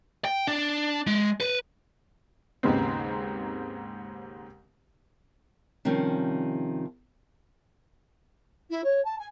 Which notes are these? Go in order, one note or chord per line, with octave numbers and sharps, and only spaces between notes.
G5
D4
G#3
B4
D#2 G#2 C#3 G#3 B3 C4
C3 D#3 F3 G3 C4 C#4
E4
C#5
A5
G#5